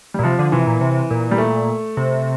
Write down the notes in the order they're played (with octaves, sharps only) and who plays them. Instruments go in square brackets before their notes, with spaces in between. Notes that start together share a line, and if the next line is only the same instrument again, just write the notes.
[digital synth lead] A#2 [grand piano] G3
[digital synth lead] C3 [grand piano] F3
[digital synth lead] D3
[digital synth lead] C3 [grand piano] E3
[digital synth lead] A#2
C3
A#2
[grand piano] G3
A3
[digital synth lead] C3